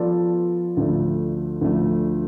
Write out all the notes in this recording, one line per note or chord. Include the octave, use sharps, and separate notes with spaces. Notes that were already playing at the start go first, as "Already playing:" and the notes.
Already playing: F3 B3 F4 A4 D5
D2 D3 F3 A3
D2 D3 F3 A3